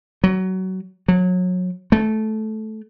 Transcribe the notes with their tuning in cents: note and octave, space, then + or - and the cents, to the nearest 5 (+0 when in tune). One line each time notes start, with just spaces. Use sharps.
F#3 +20
F#3 -25
A3 -15